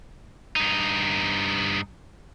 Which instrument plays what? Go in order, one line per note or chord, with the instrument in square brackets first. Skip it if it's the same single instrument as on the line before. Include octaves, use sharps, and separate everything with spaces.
[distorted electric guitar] G2 D#4